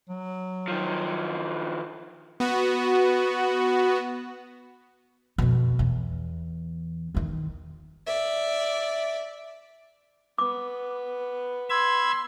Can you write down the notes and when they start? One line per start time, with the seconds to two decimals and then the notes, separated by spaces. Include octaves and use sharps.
0.09 F#3
0.68 D#3 F3
2.40 B3 F#4
5.38 F2 B2
5.79 E2
7.15 E2 D#3
8.07 D5 E5
10.38 B3 D6
11.70 B5 C6 E6 G#6